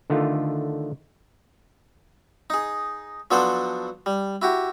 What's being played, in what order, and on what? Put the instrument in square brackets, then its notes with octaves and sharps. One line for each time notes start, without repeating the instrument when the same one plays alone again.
[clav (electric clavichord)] D3 D#3 A3 F4
[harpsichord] D#4 G#4
F3 F#3 B3 D4 A4 C5
G3
E4 F#4 G4